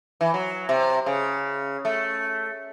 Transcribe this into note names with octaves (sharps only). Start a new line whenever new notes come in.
E3
F#3
C3
C#3
A3